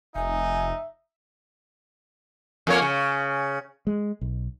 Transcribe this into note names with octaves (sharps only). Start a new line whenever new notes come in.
F1 D#4 E5 G#5
F2 A#3 C#5
C#3
G#3
B1